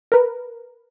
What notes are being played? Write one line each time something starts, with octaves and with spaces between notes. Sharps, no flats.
A#4 B4